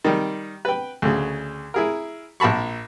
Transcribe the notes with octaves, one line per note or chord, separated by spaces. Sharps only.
D#3 G3
B4 G5
D2 C#3
E4 G#4 A#4
A#1 A#4 A5 B5 C#6